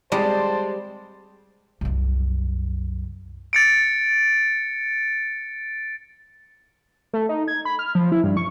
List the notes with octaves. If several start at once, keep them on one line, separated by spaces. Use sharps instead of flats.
G3 G#3 C4 C5 D5 D#5 A5
C2 F#2
A6 C#7 D7
A3
D#4
G#6
B5
F6
F3
E4
G2
C#6